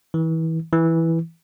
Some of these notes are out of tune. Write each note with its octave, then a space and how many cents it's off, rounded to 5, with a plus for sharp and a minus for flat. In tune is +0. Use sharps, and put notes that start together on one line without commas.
E3 -30
E3 -5